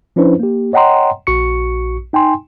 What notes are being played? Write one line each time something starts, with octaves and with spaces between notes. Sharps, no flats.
F3 C#4 D4 E4 B4 C5
A#3 G4
C#5 D#5 F#5 G5 A#5 C6
A#1 F#4 C#6 C#7
D#4 G5 G#5 C6